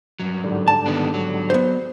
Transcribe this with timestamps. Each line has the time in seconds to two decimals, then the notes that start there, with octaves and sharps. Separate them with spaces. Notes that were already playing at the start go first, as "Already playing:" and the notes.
0.20 G2 F#3
0.44 G#2 D3 G3
0.68 A5
0.86 D#3 B3 D4
1.14 F#3
1.50 B3 C5